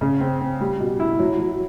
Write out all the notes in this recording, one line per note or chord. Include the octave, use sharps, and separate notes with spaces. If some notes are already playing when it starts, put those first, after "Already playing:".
C#3
C4
C4
G3
B2
E4
F#3
F#3